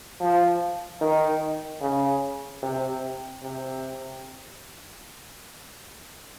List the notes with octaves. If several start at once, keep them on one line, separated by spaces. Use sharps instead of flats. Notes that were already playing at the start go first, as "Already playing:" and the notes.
F3
D#3
C#3
C3
C3